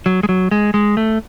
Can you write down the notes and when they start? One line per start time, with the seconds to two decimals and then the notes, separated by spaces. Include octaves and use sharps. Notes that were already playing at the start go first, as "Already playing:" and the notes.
0.06 F#3
0.23 G#3
0.29 F#3
0.51 G#3
0.74 G#3
0.97 A3